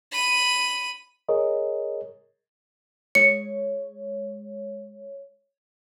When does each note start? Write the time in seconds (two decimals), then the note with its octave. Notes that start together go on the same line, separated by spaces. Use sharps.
0.12 B5 D#7
1.29 G#4 A#4 C#5 D#5
3.15 G#3 C#5 C#7